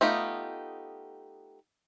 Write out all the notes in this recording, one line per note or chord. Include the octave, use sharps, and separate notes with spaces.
A3 B3 D#4 F4 G4